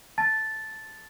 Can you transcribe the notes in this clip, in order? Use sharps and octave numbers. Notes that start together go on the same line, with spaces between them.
A5 A6